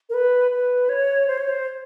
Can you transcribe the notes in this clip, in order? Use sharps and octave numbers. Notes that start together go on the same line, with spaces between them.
A#4
B4
B4
C#5
C5
C#5
C5